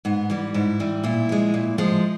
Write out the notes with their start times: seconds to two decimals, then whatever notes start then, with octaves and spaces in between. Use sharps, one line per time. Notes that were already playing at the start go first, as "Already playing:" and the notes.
0.05 G#2 B3
0.30 E3 G3
0.54 G#2 E4
0.80 E3 G3
1.04 A#2 E4
1.29 F3 G#3
1.54 A#2
1.78 F3 G#3